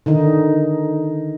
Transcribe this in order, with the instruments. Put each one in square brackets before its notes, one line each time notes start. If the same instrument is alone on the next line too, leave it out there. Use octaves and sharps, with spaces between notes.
[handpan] D3 D#3 D#4